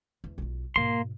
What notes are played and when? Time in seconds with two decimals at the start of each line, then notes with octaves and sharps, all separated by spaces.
0.24 E2
0.38 B1 F4
0.76 G#2 B2 A#3 C6